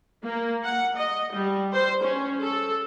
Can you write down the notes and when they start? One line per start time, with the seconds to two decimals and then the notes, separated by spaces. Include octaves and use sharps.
0.23 A#3
0.64 F#5
0.95 D#5
1.34 G3
1.73 C5
2.03 C#4
2.40 A4